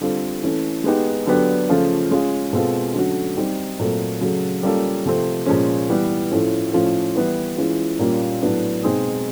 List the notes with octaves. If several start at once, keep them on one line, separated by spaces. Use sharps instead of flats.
D3 G3 C4 F4 A4
E3 A3 C#4
G#3 B3 D#4 G4
D3 F#3 B3 D4 G4
C#3 F3 A3 C#4 F4
G#3 C#4 F4 G#4
B2 G#3 C4 F4 A4
D3 F#3 A3 C#4 F#4
G3 C4 D#4
A#2 F#3 A3 C4
C#3 F#3 A3
G3 A#3 C#4 F4 A4
C3 F3 A3 C4
A#2 F3 G#3 C#4
E3 G3 B3
A2 F3 A3 C#4
A2 F3 A3 C#4 F4
E3 G3 B3 E4
E3 G#3 C#4 F4
A#2 G3 A#3 C#4 F4
A2 F#3 B3 D4
B2 G#3 C4 D#4 G#4